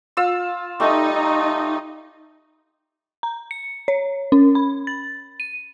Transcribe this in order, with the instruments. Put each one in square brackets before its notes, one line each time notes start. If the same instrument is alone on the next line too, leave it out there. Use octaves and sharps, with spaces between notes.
[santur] F4 E6
[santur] G3 A3 [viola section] D#4
[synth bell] A#5
C#7
C#5
C#4
B5
A6
D#7